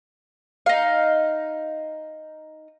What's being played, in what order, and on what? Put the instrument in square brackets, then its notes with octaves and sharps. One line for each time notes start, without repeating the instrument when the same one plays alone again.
[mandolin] D#4 F5